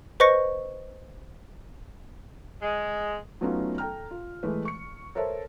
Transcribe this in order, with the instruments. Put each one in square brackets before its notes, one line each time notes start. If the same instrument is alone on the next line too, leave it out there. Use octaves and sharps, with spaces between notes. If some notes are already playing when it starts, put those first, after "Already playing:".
[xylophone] B4 C5 D#5 C#6 A#6 C#7
[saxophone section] G#3
[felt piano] F#3 A3 B3 C#4 D#4 F4
A4 G5 A#5 F6
F4
E3 G#3 A3 B4
C#6 C#7
A4 A#4 C5 C#5 E5 A5